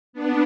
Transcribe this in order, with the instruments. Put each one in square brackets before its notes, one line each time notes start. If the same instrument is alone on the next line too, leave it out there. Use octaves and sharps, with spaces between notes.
[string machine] B3 D4